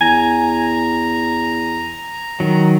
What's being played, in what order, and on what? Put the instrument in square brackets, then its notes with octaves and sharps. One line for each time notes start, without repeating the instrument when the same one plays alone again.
[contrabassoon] E2 [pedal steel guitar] G#5 [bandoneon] A#5
[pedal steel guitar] D#3 F#3